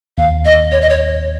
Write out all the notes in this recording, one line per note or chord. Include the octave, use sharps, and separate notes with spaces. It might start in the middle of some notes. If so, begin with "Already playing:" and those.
D#2 F5
D#2 D#5
D#2 C#5
D#5
C#5